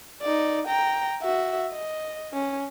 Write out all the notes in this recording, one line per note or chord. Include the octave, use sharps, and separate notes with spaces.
D#4 D5
G5 A#5
F#4 E5
D#5
C#4